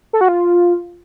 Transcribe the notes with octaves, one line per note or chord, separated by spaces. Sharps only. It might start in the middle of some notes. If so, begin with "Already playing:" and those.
A4
F#4
F4